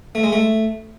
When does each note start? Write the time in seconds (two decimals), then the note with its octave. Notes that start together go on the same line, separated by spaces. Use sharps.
0.15 A3
0.23 G#3
0.32 A3